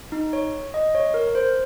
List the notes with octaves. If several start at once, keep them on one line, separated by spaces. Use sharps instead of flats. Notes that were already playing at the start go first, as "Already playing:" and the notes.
D#4
C#5
D#5
C#5
A#4
C5